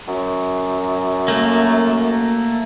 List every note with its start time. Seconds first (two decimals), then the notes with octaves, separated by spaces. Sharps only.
0.07 F#2
1.28 A3 A#3